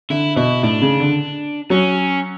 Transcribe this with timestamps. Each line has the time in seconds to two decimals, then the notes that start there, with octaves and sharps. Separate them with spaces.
0.10 D3 E4
0.36 B2 E4
0.63 A2 D4
0.82 C#3
1.00 D3
1.70 F#3 C#4